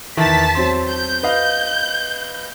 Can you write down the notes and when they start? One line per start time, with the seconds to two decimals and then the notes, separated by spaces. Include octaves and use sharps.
0.17 E2 D#3 E3 A5 B6
0.55 F#3 C4 C6
0.91 G6
1.23 B4 D#5 F5